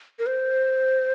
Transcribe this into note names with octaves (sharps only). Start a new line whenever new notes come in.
A#4
C5